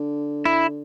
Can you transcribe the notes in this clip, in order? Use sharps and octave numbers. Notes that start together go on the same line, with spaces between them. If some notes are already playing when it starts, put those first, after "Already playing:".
Already playing: D3
E4